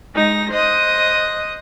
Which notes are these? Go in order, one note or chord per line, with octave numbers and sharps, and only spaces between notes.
G#3 D#4 A#6
C5 D#5 D#6 F#6